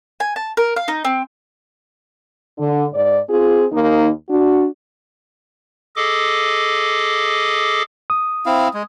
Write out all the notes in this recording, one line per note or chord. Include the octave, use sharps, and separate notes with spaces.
G#5
A5
A#4
F5
D#4
C4
D3
G#2 D5
C4 F4 G#4
D#2 A#3 D#4
D4 F#4
G#4 A4 D#5 D6
D#6
C4 E4 F5
G#3